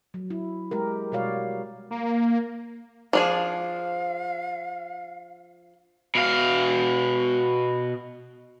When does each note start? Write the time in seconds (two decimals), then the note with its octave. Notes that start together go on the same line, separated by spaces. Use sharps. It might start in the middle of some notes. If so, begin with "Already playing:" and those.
0.14 F#3
0.30 E4
0.71 G#3 G4 A#4
1.12 B2 G3 F#4 C#5 D5 F5
1.91 A#3
3.13 F3 D4 G#4 F5
6.15 B2 F5